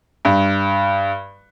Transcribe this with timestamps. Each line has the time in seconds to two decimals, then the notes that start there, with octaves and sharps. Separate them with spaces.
0.25 G2